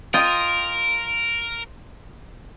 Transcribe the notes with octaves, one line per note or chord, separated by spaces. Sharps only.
F4 A#4 D#5 G5